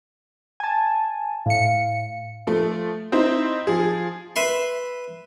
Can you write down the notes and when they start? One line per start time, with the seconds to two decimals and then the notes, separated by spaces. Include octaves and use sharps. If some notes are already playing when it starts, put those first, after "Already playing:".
0.60 G#5 A5
1.46 A2 F5 C#7
2.47 F3 A3
3.12 C4 D#4 E4 C5
3.67 F3 G#4
4.36 B4 E5 C6